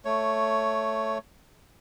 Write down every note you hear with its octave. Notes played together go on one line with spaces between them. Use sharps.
A3 C#5